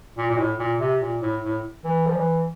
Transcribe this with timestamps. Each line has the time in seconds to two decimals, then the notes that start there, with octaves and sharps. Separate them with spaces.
0.18 A#2
0.30 A#2
0.38 A2
0.59 A#2
0.80 C3
1.01 A#2
1.22 A2
1.43 A2
1.84 E3
2.07 F3
2.16 E3